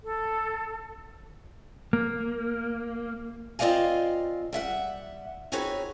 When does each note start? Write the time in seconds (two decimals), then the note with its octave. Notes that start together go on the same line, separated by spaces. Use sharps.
0.04 A4
1.93 A#3
3.59 C4 F4 D5 D#5 F5 G#5
4.53 G3 E5 F#5
5.52 C4 D#4 F#4 G#4 B4 C#5